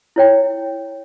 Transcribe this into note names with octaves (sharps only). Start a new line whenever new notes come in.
E4 C#5 G5